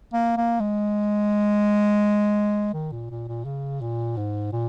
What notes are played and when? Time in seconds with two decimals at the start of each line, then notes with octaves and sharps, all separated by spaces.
0.13 A#3
0.37 A#3
0.60 G#3
2.74 D#3
2.92 A#2
3.10 A#2
3.28 A#2
3.45 C#3
3.81 A#2
4.17 G#2
4.53 A#2